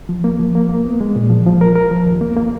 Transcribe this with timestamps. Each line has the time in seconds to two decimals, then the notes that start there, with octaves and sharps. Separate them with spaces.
0.09 F3
0.24 A#3
0.40 F3
0.55 A#3
0.69 A#3
0.85 B3
1.01 G#3
1.16 A#2
1.30 F3
1.46 F3
1.61 A#4
1.76 A#4
1.91 F3
2.06 D#2
2.21 A#3
2.36 A#3